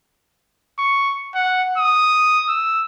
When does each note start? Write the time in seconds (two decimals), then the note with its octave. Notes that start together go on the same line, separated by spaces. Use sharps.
0.79 C#6
1.35 F#5
1.78 D#6
2.49 E6